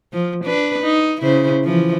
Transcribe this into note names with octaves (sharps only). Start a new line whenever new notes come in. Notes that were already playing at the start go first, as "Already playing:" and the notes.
F3
D4 B4
D#4
C#3 E4 C5
E3 F3